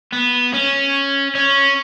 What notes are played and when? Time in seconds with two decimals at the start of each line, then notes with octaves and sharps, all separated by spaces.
0.12 B3
0.54 C#4
1.35 C#4